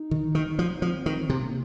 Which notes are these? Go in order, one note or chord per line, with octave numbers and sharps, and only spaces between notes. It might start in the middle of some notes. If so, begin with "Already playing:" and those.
Already playing: D#4
D#3
D#3
F3
F3 C4
D#3
C3 A#3